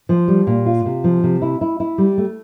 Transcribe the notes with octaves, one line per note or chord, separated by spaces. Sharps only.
F3
G3
A#2
F4
C3
F3
C3
E4
E4
E4
G3
A3